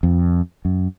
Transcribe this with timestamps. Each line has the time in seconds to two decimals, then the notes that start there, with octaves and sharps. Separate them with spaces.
0.03 F2
0.65 F#2